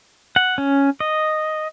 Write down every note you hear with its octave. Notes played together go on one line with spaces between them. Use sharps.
F#5
C#4
D#5